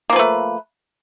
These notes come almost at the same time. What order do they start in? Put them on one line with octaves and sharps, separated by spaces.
A#3 F3 B4 A3